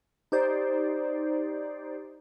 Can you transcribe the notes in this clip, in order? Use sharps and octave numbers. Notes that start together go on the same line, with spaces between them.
D#4 G4 C5 D5